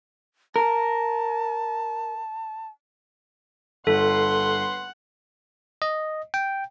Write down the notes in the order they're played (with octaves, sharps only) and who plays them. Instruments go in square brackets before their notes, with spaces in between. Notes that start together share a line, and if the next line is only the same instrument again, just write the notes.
[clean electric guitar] A#4 [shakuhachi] A5
[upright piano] G1 [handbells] A4 [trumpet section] B4 C6 [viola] F#5
[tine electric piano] D#5
G5